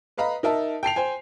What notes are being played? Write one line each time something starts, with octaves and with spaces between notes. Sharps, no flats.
B4 D#5 F5 A#5 B5
D#4 A#4 E5 A5
G5 A5 C7 F7
C5 G5 G#5